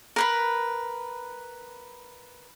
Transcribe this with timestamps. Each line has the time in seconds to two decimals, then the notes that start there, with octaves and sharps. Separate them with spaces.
0.16 A#4 B4 B5